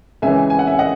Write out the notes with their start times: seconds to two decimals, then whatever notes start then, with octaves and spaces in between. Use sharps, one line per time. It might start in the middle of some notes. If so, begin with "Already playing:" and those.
0.22 C#2 C#3 E3 E5 G#5
0.50 G#5
0.59 F#5
0.67 E5 G#5
0.79 D#5 F#5